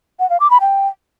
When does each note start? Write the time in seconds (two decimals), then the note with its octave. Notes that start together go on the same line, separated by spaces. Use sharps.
0.20 F#5
0.30 F5
0.40 D6
0.50 B5
0.61 G5